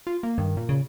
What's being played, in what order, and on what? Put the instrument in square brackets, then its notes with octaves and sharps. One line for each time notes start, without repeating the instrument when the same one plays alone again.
[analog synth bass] F4
A#3
[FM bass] G2 [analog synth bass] D#3
[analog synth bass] A#2
[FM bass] C#3